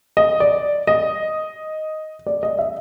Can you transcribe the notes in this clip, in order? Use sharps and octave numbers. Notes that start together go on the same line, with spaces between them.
D#5
D5
D#5
D5
D#5
E5